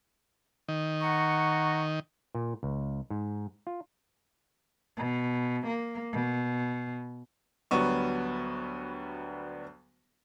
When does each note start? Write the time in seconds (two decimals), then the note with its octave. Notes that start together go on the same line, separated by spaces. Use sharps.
0.68 D#3
1.02 F#5 A#5 C#6
2.35 A#2
2.63 C#2
3.10 G#2
3.67 F4
4.97 B2
5.67 A#3
6.13 B2
7.71 D2 F#3 G3 B3 C#6